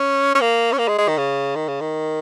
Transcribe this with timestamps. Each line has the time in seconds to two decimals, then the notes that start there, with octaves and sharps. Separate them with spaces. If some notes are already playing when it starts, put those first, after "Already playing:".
Already playing: C#4
0.35 C#4
0.41 A#3
0.73 C#4
0.78 A#3
0.88 G#3
0.98 G#3
1.08 D#3
1.18 C#3
1.56 D#3
1.68 C#3
1.81 D#3